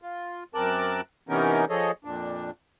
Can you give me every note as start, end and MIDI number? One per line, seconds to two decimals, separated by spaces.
0.02 0.44 65
0.54 1.01 42
0.54 1.01 60
0.54 1.01 70
0.54 1.01 81
0.54 1.01 86
0.54 1.01 90
1.29 1.65 48
1.29 1.65 52
1.29 1.65 59
1.29 1.65 61
1.29 1.65 63
1.29 1.65 70
1.70 1.91 53
1.70 1.91 68
1.70 1.91 69
1.70 1.91 73
1.70 1.91 75
2.05 2.51 41
2.05 2.51 46
2.05 2.51 62